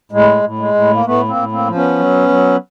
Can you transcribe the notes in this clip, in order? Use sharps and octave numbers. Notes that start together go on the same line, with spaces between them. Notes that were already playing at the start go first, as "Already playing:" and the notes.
A2 G#3
A2
G#3
A2
A#3
A2 A3 B3
A#3 C4
A2
A#3 C4
F3
B3 C#4
F#3
F#3